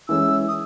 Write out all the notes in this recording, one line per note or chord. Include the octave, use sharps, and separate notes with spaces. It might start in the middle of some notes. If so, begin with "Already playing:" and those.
E3 G#3 C#4 G#4 E6
D#6